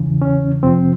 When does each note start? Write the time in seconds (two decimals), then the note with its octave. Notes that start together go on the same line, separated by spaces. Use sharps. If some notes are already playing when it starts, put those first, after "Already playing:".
Already playing: E2 C#3 E3
0.22 C#4
0.63 F2 C3 F3 C4